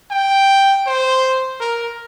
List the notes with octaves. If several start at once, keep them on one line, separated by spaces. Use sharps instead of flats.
G5
C5
A#4